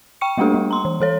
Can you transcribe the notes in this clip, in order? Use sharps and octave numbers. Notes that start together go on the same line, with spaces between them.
G5 C#6 C#7
G3 A3 A#3 D4 G4 A4
G3
A#5 C6
E3
E3 A4 C#5